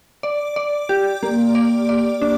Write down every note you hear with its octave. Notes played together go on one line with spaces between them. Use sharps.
D5
D5
G4
A#3
D5
D5
D4